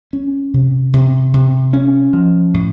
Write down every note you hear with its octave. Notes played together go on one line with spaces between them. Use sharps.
C#4
C3
C3
C3
C#4
F3
A2